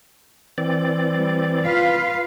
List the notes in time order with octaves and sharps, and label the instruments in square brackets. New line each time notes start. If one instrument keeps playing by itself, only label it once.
[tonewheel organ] E3 C4 D5
[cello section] G3
F4 B4 F5